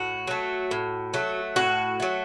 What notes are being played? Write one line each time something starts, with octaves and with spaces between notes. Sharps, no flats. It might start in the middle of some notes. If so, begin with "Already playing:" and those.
Already playing: A2 F#4
F#3 A3
A2
F#3 A3
A2 F#4
F#3 A3